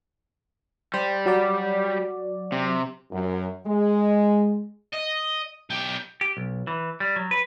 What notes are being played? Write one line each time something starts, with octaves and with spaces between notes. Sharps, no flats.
G3 C5
F#3 F#4 D5
C3
F#2
G#3
D#5
B1 G4
G4
B1
E3
G3
F#3
B4